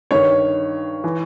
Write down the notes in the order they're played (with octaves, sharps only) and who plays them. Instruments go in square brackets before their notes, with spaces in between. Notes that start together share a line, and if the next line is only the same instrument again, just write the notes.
[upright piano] G2 D#3 C#5
E3